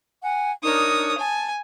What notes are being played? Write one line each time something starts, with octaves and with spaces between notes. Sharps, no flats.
F#5 G#5
D4 D#4 A#4 C#5 D#6
G#5 A5